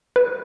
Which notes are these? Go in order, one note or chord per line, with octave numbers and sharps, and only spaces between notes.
B4